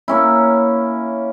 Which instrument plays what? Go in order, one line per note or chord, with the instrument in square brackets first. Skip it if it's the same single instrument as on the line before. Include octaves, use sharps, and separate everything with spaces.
[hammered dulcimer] A#3 C#4 E4